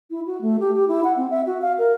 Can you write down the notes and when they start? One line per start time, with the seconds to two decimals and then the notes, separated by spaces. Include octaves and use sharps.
0.11 E4
0.26 F#4
0.41 A3
0.60 G4
0.75 G4
0.88 E4
1.04 F#5
1.17 C4
1.30 E5
1.46 F#4
1.62 F5
1.78 A#4